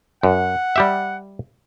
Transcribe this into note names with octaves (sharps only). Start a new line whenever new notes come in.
F#2 F#5
G3 G4 E5